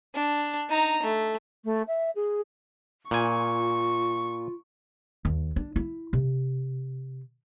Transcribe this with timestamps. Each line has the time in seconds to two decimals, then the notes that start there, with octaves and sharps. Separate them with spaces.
0.15 D4
0.70 D#4 A#5
1.03 A3
1.64 A3
1.87 E5
2.15 G#4
3.11 A#2 F4 G#5 C#6
5.25 D#2
5.56 D4
5.76 E4
6.13 C3